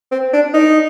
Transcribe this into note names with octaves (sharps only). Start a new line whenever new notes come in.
C4
D4
D#4